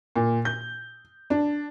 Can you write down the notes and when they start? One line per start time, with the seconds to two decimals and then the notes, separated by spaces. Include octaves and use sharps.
0.16 A#2
0.45 G6
1.30 D4